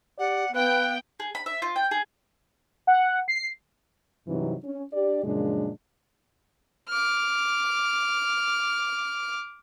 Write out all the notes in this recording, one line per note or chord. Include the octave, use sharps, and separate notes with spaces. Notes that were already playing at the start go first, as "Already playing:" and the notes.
G4 D5 F#5
B3 B4 F5 G5 F#6
G#4
B5
E5
F4
G5
G#4
F#5
C7
G2 C3 E3 F#3 C4 D#4
C#4
D4 G4 D5
F#2 A#2 C#3 F3 G#3 D4
D6 F6